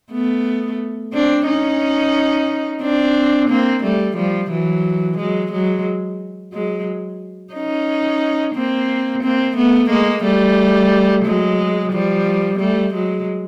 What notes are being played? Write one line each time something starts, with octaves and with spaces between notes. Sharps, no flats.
A3 B3
C4 D4
C#4 D#4
C4 D4
A#3 C4
G3 A3
F3 G3
E3 F#3
F#3 G#3
F#3 G#3
F#3 G#3
C#4 D#4
A#3 C4
A#3 C4
A3 B3
G#3 A#3
G3 A3
F#3 G#3
F3 G3
G3 A3
F#3 G#3